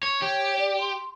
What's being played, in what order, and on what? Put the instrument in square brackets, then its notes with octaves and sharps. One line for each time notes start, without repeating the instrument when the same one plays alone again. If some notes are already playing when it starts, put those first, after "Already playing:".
[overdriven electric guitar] C#5
[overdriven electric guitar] G4 [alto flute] C#5
[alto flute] D5
C6